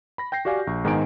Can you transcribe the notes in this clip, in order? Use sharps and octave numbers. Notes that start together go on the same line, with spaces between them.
B5 A#6
G5 G6 A#6 C7
F#4 G4 D5 F5 G#5
A#1 C#6
G#2 D#3 B3 D#4 G#5 D7